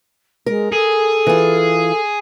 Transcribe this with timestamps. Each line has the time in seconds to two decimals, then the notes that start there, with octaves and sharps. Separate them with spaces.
0.46 G#3 A#4
0.72 G#4 A4
1.27 E3 F4